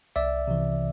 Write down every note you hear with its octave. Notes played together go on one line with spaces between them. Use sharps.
C2 D5 E5
C3 E3